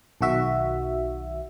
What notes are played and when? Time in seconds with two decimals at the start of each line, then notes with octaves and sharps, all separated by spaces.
0.21 B1 D#3 F#4 E5